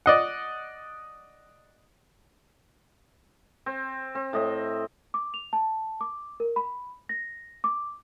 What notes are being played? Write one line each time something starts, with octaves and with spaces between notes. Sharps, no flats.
D5 D#5 F#5
C4
C4
A2 D#5 E5
D6
F7
A5
D6
A#4
B5
A#6
D6